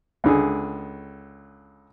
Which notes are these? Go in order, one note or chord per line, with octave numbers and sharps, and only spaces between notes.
C#2 D3 G#4